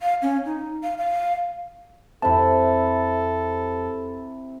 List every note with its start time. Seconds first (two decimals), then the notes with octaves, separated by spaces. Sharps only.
0.01 F5
0.22 C#4
0.46 D#4
0.84 F5
0.98 F5
2.22 F2 C3 E4 A4 A5